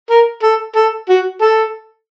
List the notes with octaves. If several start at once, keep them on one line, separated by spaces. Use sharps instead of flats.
A#4
A4
A4
F#4
A4